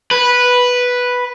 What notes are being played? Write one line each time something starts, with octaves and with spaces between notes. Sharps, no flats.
B4